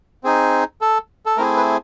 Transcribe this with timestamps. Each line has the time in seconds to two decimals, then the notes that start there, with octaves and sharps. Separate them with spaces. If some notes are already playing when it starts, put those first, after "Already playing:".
0.24 C4 D#4 G#4
0.81 A4
1.26 A4
1.37 A3 C4 E4 G#4 A#4
1.57 B4